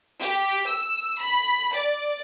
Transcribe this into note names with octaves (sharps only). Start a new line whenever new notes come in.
G4
E6
B5
D5